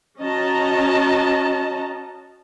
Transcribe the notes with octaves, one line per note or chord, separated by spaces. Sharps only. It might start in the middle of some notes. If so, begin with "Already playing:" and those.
C#4 F#4 D#5 A5 A#5